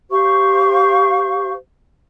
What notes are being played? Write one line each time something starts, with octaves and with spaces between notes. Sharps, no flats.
G4 C5 F5 C#6